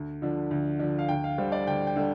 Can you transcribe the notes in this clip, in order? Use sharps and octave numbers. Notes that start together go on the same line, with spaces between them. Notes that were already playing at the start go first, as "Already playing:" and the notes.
Already playing: D2
D3 F3 D4
D2
D3 F3 D4
F5
D2 G5
F5
D3 G3 D4 C5
D5
D2 G5
G5
D3 G3 D4